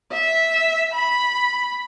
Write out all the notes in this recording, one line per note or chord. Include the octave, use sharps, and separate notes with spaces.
E5
B5